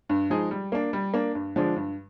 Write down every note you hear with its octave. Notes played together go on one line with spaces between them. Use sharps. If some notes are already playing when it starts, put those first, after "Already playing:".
G2
F3 G#3 D#4 G#4
G3
A#3 D4
G3
A#3 D4
G2
D3 F3 G#3 D4
G2